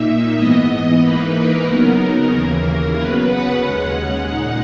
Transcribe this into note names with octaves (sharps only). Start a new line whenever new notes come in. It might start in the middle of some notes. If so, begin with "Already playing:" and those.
Already playing: A#2 A#3 D#4 E5
G#2 E3 B3 D#5
G#2 E3 A#3 D#4 B4
A#4
C#3 F#3 B3 D#4
D#2 C#3 E3 A#3
F#2 C#3 F#3 B3 B4
F#5
D#2 C#3 G#3 C#4 F#5
A#2 G#3 D#4